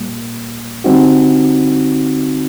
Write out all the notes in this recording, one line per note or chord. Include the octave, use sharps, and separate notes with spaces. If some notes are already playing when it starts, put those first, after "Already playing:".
Already playing: A#2 G3 A#3
D3 G3 C4 D#4 F#4